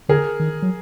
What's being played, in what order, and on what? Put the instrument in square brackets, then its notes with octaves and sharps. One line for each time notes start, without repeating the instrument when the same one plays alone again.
[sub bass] D3 [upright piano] G#4 A#4
[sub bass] D#3
F#3